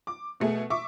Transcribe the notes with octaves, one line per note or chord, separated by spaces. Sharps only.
D6
B2 A3 G#4
E5 C#6 D6